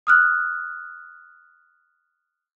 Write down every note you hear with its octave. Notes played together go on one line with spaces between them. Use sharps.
D#6 F6 F#6